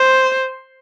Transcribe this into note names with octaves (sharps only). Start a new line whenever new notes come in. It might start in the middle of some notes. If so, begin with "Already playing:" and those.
Already playing: C5